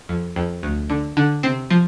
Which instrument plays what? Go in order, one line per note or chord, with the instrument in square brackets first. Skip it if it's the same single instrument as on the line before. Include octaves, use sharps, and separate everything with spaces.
[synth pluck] F2
F2
D2
D3
D3
C3 C4
F3